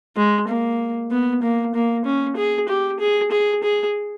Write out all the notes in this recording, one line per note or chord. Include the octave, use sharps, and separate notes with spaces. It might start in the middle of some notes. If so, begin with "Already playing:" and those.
G#3
A#3
B3
A#3
A#3
C#4
G#4
G4
G#4
G#4
G#4